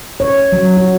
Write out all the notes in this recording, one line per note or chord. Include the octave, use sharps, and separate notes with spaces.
C#5
F#3
F#4